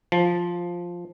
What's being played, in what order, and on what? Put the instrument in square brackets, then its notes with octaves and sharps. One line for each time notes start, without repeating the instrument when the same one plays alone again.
[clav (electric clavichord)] F3